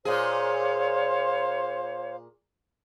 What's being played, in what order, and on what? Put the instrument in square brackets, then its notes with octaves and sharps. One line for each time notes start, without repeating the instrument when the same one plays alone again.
[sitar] A#2 G#4 [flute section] C5 C#5 F5